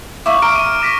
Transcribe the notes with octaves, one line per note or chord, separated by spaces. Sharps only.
E4 E5 F5 C#6 D6
A#5 F6 D7
D#7
D6 A#6 B6